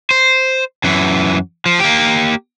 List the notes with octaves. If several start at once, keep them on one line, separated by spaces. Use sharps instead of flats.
C5
F#2 E3
F3
A#3 G4